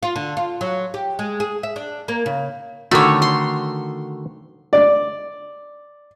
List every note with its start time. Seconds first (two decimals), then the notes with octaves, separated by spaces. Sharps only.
0.03 F4
0.16 D3
0.37 F4
0.61 F#3
0.94 G4
1.19 G#3
1.40 G#4
1.63 E5
1.76 D4
2.08 A#3
2.26 C#3
2.91 D3 D#3 A3 F#4 C#5
3.22 C6
4.73 D5